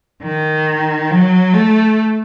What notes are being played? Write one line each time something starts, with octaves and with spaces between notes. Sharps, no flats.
D#3
F#3
A3